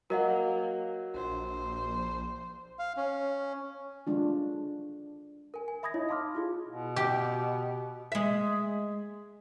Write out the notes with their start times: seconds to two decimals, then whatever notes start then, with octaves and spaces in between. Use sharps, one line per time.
0.10 F#3 A#3 A#4 D#5 F#5
1.14 A#1 C5
2.79 F5
2.97 C#4
4.07 G#3 D4 F4
5.54 A#4 G#5
5.68 G#5
5.83 E5 B5 D#6 G#6 A#6
5.94 D#4 E4 C#5 D#5
6.09 F5 A5 C6 D6 F6
6.35 E4 F4 G#4
6.68 B2
6.96 G4
8.12 G#3 E5